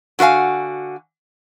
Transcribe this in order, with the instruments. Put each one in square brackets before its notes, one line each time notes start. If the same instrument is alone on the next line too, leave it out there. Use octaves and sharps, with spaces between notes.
[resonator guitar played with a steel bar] D3 F#4 B4 F5 G#5